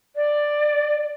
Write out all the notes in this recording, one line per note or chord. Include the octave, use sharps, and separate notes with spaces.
D5